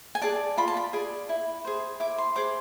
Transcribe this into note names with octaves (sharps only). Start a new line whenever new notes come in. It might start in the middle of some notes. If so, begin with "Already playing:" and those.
G#5
G#4 D5 A5
F4 B5
A5
B5
G#4 D5
E4
G#4 C5
E4 D6
C6
G#4 C5 D6